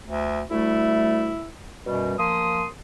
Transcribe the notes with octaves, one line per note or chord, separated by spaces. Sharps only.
D2
D2 G3 A3 E4
F#2 B2 G3
F3 A#3 C6 D#6